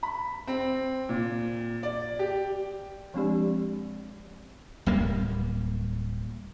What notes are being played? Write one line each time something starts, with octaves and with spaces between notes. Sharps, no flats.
B5
C4
A#2
D5
G4
F3 G#3 C4 D4 G4 D5
D1 G3 A#3